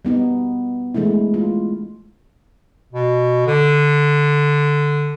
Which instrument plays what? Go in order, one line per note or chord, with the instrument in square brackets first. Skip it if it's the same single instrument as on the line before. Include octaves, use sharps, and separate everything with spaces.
[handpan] G3 B3 D#4
E3 G#3 A3 D4 E4
F4
[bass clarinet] B2
D3